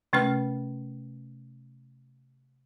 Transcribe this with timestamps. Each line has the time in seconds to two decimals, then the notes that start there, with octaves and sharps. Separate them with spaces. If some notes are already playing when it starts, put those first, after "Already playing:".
0.13 C3 A3 C#4 B4 F6